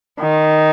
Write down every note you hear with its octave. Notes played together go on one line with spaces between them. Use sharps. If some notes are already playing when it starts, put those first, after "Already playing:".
D#3